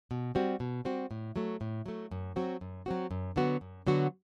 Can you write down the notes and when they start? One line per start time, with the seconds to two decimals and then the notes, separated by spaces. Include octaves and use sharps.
0.11 B2
0.35 G3 C4 F#4
0.60 B2
0.85 G3 C4 F#4
1.11 A2
1.36 F#3 A3
1.61 A2
1.86 F#3 A3
2.11 F#2
2.36 F#3 C4 F#4
2.61 F#2
2.86 F#3 C4 F#4
3.11 F#2
3.36 D3 F#3 B3 F#4
3.61 F#2
3.87 D3 F#3 B3 F#4